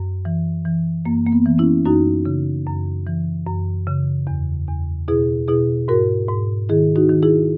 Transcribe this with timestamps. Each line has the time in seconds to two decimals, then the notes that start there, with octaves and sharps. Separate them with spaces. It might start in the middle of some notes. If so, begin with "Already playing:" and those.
Already playing: F#2
0.25 E3
0.65 E3
1.05 F#2 A#3
1.26 A#3
1.32 B3
1.46 E3
1.59 C#4 E4
1.85 F#2 D#4 F#4
2.25 C#3
2.67 F#2
3.07 E3
3.47 F#2
3.87 C#3
4.27 E2
4.68 E2
5.08 B2 E4 G#4
5.48 B2 E4 G#4
5.88 G#2 F#4 A#4
6.29 G#2
6.69 D#3 E4 G#4
6.96 D#4 F#4
7.09 D#3
7.22 E4 G#4